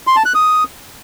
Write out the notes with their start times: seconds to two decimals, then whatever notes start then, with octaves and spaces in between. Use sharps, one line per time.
0.07 C6
0.16 A5
0.25 F#6
0.35 D#6